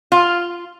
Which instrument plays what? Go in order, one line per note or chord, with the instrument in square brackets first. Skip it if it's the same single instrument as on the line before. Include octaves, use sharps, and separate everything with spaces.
[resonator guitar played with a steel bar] F4